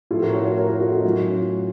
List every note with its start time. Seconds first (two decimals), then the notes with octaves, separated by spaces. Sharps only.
0.11 A2 F3 F4 A4
0.22 F#4 A#4
0.34 A#4 C#5
0.46 A#4 C#5
0.57 F#4 A#4
0.68 F#4 A#4
0.81 F4 A4
0.92 D#4 F#4
1.04 A2 F#3 C#4 F4